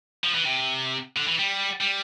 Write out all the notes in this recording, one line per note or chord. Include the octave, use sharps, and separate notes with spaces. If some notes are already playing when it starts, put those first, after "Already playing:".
F3
E3
C3
D3
E3
G3
G3